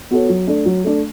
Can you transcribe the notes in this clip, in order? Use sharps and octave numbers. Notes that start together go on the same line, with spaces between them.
B3 F#4 A4 C#5
F#3
A3 D4
F#3
A3 D4